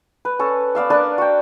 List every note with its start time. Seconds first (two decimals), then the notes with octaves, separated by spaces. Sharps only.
0.25 B4
0.39 C#4 A4
0.75 B3 D5 F5 E6
0.90 D4 A#4 B4 A5
1.18 F#4 G5